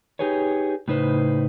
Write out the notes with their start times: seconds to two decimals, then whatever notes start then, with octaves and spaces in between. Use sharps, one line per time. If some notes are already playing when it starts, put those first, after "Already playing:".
0.19 D#4 E4 G4 G#4 B4 C#5
0.88 A2 C#3 D#4 B4 C5